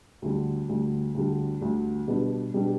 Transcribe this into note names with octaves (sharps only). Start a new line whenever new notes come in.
D2 D3 G3
D2 D3 G3
D2 D3 G3
D2 D3 G3
B2 G3 B3 D4 G4
B2 G3 B3 D4 G4